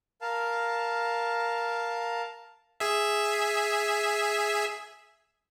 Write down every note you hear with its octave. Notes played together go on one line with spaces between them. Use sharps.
A#4 F5 A5
G#4 E5